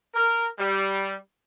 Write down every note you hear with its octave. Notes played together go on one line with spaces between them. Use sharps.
A#4
G3